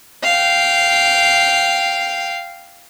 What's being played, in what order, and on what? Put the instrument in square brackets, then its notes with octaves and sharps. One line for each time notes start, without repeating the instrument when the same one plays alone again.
[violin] F5 G5